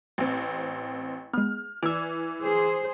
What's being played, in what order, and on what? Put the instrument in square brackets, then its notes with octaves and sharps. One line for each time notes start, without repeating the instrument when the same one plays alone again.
[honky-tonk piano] A1 C4
[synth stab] G#3 B3 [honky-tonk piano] F6
[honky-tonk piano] E3 E6 [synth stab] D5 G#6
[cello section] G#4 C5